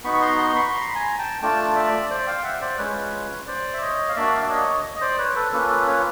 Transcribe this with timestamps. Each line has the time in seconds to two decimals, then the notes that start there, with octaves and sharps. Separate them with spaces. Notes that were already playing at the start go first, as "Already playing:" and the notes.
0.04 B3 D#4 F#4 B5 C#6
0.14 C#6
0.21 A#5 C6
0.38 A#5 C6
0.55 B5 C#6
0.73 A#5 C6
0.89 B5
0.95 G#5 A#5
1.19 G5 A5
1.41 A3 D4 F4 G5 A5
1.76 D5 E5
2.10 C5 D5
2.27 F5 G5
2.44 E5 F#5
2.61 C5 D5
2.79 G#3 C#4 F4 B4 C#5
3.47 C5 D5
3.74 E5
3.81 C#5 D#5
4.09 F5
4.16 A#3 D4 F#4 D5 E5
4.33 F5
4.42 E5
4.50 C#5 D#5
4.96 D#5
5.01 C5 D5
5.18 B4 C#5
5.35 A4 B4
5.53 A#3 C#4 F4 A4 B4
5.70 A4 B4
5.87 B4 C#5